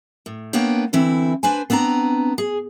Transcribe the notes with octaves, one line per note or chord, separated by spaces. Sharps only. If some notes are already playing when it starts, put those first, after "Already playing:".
A2
A#3 B3 D4 C#5 G5
D3 E3 C4 E4
D4 B4 C5 G#5
B3 C4 D4 A5 A#5
G#4